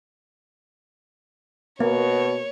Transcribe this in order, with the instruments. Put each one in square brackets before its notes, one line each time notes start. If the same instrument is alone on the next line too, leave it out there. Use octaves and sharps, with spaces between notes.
[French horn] B2 [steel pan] A#3 [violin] C#5